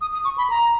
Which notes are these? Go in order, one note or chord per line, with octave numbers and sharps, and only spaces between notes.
D#6
D#6
C#6
B5
A#5